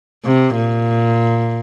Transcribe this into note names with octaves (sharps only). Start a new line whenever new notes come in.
C3
A#2